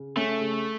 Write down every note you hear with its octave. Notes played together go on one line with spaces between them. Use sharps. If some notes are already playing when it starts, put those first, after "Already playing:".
Already playing: C#3
A3 C#4
C#3